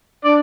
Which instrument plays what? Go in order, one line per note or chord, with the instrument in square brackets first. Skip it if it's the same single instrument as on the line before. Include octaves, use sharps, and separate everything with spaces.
[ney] D4 [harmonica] D5